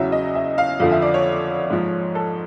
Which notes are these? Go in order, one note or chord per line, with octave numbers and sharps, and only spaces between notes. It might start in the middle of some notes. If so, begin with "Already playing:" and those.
Already playing: E2 C#3 F#3 E5
D#5
E5
F5
F2 D3 F3 F5
E5
D5
C#5
G#2 F3
A4